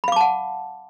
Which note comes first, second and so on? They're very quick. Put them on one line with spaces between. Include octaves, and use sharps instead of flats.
B5 F5 D6 A5 F#5